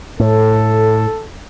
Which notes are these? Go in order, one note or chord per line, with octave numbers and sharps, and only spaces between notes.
A2 A4